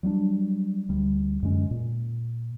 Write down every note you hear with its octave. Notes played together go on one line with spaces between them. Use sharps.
F#3 G3 B3 D4
D2 G3
F#2 D3 G#3 C#4
A#2